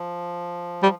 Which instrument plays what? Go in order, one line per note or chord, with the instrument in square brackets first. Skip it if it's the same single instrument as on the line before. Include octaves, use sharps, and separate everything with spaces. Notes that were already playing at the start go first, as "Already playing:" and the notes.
Already playing: [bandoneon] F3
[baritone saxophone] G3